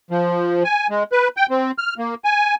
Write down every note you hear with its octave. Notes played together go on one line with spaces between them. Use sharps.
F3
G#5
G#3
B4
G5
C4
F6
A#3
G#5